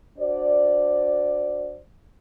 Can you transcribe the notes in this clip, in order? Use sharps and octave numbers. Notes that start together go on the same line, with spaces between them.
D4 F#4 C5 D5